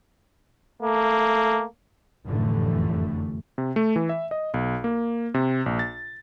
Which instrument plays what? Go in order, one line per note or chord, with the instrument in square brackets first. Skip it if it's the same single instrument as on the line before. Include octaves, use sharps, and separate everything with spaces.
[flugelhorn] A3 [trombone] A#3
[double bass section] F1 F#2 A2 D3 E3 A3
[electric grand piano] C3
A3
E3
E5
D#5
B1
A#3
C3
A#1
A6